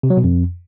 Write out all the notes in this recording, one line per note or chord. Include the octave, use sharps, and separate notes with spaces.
C3
F#3
B2
F2